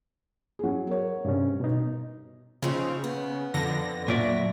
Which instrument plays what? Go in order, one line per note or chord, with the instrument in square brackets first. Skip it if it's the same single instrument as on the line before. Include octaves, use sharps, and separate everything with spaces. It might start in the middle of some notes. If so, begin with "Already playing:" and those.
[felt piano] F#3 G#4
A#4 C#5
[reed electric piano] G2 C3 C#4
B2 D#4
[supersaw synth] C#3 [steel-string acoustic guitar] F3 C4 D#4
[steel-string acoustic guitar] B3
[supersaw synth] F2 D3 A#6
[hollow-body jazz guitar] A#2 D5 [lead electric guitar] F#3 E5